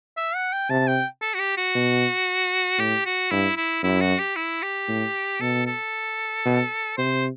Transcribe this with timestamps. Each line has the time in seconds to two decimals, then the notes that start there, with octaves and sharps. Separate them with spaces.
0.17 E5
0.35 F#5
0.53 G5
0.70 C3 A5
0.87 G5
1.21 A4
1.34 F#4
1.39 G4
1.57 F#4
1.75 B2
2.79 A2 G4
3.06 F#4
3.31 G2 E4
3.57 E4
3.83 F#2 E4
4.01 F#4
4.18 G4
4.36 E4
4.62 G4
4.88 A2
5.40 B2 A4
5.67 A4
6.45 B2
6.97 C3 C5